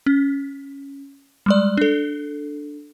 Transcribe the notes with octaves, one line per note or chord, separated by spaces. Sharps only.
C#4
G3 G#3 D5
D4 A4